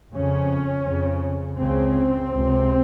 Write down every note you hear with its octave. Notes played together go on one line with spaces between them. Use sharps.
F2 C#3 C#4
F2 C#3
C#2 C#3 C4
C#2 C3